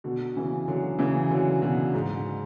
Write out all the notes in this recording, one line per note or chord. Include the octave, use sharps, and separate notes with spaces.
B2 D3
C#3 E3
D3 F#3
C#3 E3
D3 F#3
B2 D3
G#2